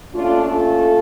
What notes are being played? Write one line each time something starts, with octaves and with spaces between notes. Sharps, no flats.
A#2 A3 C#4 D4 F4
F4 A4